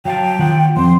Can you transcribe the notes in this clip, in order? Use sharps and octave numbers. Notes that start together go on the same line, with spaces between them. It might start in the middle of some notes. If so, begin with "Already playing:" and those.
F#3 F5 G5 A5
D#3 F4 F#5
F3 C4 C6